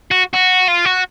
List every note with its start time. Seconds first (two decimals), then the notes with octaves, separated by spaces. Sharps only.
0.11 F#4
0.34 F#4
0.68 F4
0.85 F#4